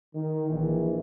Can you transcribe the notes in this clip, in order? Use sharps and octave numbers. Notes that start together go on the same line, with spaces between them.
D#3
A#1 E3